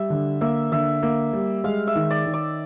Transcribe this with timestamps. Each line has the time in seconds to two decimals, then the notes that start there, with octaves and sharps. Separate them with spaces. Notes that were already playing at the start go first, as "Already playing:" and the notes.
Already playing: G3 E5
0.10 D3
0.41 A#3 E5
0.72 D3 E5
1.03 A#3
1.33 G3
1.64 G#3 F5
1.87 E5
1.95 D#3
2.10 D5
2.26 D#3
2.33 D5